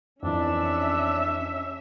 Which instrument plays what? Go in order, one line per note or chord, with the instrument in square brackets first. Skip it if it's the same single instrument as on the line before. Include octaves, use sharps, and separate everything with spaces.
[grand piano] F2 E3 [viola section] C#4 E5 [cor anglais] D4